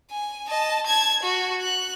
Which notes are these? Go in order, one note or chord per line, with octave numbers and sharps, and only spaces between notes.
G#5
D#5 A5
A5 G#6
F#4
F#6